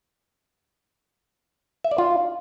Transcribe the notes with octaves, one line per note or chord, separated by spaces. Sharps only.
E5
D5
F4